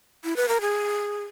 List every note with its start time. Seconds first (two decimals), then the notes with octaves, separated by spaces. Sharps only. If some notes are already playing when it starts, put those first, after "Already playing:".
0.24 E4
0.37 B4
0.49 A#4
0.61 G#4